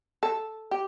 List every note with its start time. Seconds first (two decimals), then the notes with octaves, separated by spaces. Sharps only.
0.23 A4
0.71 G4